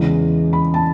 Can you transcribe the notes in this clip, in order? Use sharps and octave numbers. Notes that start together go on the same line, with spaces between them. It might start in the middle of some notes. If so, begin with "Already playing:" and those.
Already playing: E2 C#3 E3 G#3
B5
A5